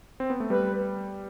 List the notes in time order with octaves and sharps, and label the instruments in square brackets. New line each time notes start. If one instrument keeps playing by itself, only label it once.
[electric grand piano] C4
B3
A3
[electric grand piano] G3 [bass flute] B4